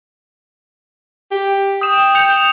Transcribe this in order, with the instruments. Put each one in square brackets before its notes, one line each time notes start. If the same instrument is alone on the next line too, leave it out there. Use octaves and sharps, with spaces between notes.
[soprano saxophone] G4
[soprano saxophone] G5 [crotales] D#6 E7
[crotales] G6 C#7 F7